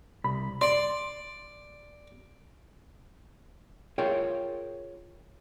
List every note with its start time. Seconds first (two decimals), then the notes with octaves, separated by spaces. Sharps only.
0.24 C2 B5
0.61 D5 C6
3.98 F4 G#4 A#4 C#5 G5